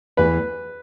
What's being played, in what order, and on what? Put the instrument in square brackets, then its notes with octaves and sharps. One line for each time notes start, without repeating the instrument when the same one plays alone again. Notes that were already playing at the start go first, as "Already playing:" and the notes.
[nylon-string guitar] E2 E3 A3 [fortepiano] B4